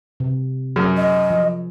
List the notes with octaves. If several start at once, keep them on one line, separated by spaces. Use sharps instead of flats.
C3
F#2 G#4
D#5
F3